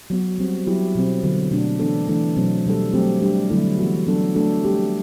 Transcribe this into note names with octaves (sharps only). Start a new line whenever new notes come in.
F#3 B3 F#4
G3 C4 F#4
F#3 B3 E4 G4
B2 F#3 C4
D3 F#3 B3
B2 A3 D4
E3 B3 D4 A4
E3 A3 D4 A4
B2 F#3 A3 C4
B2 G3 D4 A4
F#3 A3 C4 G4
G3 D4 G4
D3 F#3 A3 E4 A4
E3 B3 F#4
F#3 B3 D4 A4
A3 D4 F#4 A4
G3 C4 G4